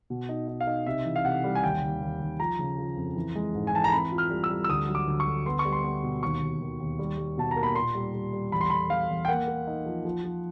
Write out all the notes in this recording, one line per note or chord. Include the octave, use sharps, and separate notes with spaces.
B2
D#4
D#4
F5
D#4
C3 E5
E3
F5
C3 F#5
G3
G#5
D#2 G5
D#2
D#2
D#2
F3 A#5
C#3
F3
F2
E3
G#3
G#2
G#5
E3 A5
A#5
C4 B5
F4
F6
G3
E6
G3
E6
D2 D#6
F#3
D6
D2
C#6
D2
B3 C6
C#6
G3
C6
B3
B2
D#2 C#6
D#2
D#3
D#2
G3
G3
B2 A5
A#5
A#3
B5
A#2 C6
G3
G3
G3
E2 B5
C6
E2 B5
E2 F5
E2
G5
A#3 F#5
A#3
D#4
F3
F3
F3